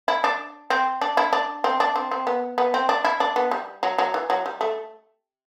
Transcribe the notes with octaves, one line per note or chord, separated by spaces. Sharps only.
E4
D4
C4
D4
E4
D4
C4
D4
C4
C4
B3
B3
C4
D4
E4
D4
B3
G3
F#3
F#3
E3
F#3
G3
A3